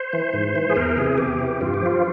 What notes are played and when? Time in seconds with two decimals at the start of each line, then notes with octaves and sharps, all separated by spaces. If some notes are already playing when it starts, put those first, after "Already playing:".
Already playing: C5
0.13 E3
0.33 G#2
0.55 E3
0.69 G#4
0.76 E2 A#4
0.97 C3 E3 G#4
1.18 E2 G4
1.39 C3 E3
1.61 G2 F4
1.74 G4
1.82 F3 F4